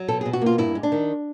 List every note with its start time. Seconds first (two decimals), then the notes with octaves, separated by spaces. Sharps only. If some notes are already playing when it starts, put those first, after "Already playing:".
Already playing: F#3
0.08 B2 A4
0.21 G#4
0.26 B2
0.33 F#4
0.42 A#3 F4
0.58 G2 E4
0.75 G#3
0.83 D4
0.92 D#3